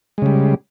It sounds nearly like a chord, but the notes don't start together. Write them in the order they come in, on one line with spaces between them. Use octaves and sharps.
G#3 C#3 G3